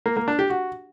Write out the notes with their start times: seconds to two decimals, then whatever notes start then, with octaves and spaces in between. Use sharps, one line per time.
0.06 A#3
0.17 A#3
0.28 D4
0.39 G4
0.50 F#4